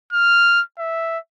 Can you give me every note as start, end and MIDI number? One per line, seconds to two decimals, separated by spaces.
0.12 0.62 89
0.79 1.18 76